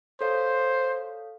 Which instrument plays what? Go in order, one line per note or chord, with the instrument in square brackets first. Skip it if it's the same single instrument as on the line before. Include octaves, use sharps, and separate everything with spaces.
[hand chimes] A4 C#5 F5 [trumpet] C5